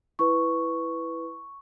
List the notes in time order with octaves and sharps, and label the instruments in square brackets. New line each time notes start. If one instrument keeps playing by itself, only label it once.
[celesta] E4 B4 C#6